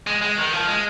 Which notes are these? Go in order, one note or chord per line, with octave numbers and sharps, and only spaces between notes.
G#3
G#3
D#3
F3
G#3